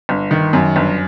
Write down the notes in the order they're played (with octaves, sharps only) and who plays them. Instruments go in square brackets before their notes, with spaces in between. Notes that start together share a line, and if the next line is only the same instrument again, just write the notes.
[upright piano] G1
D#3
F#2
G1